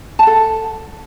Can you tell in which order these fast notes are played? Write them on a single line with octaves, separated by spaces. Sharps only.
A5 F#5 A4